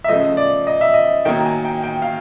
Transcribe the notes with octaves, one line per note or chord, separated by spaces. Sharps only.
E5
C#3 F3 A3 D#5
D5
D#5
E5
D#5
D#3 F#3 A#3 G5
G#5
G5
G5
F5